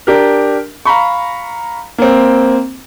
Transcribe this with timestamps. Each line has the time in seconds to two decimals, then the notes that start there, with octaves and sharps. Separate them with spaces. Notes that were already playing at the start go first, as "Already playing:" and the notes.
0.07 D4 G4 A#4
0.85 F5 A#5 B5 C#6
1.98 A#3 C4